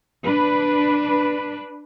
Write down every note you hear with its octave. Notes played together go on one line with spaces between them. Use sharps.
D4 B4